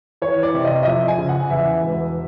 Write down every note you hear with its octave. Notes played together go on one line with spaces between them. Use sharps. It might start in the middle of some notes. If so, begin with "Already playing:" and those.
E3 C#5
D5
C3
D#5
D#5
F2 E5
G#5
C#3
F#5
E2 E5
E1